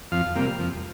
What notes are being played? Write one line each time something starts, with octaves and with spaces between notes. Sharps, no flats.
F2 F5
C3 G3 A#3
F2